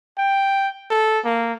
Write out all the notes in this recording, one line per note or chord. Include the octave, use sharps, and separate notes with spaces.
G5
A4
A#3